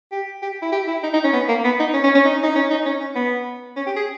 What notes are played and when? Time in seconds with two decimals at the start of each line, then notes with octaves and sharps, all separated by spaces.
0.12 G4
0.42 G4
0.62 E4
0.72 G4
0.87 E4
1.03 D#4
1.13 D#4
1.24 C#4
1.33 B3
1.49 A#3
1.64 B3
1.80 D#4
1.94 C#4
2.04 C#4
2.15 C#4
2.25 D#4
2.43 D#4
2.55 C#4
2.71 D#4
2.86 C#4
3.01 C#4
3.15 B3
3.76 C#4
3.86 G4
3.96 G#4